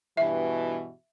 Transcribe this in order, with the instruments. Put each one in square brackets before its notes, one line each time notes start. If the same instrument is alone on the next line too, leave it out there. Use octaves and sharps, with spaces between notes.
[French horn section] G2 B2 E3 [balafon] E5